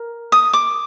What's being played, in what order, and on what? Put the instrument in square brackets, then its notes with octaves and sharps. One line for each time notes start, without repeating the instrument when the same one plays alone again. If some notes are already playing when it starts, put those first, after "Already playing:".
Already playing: [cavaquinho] A#4
D#6
D6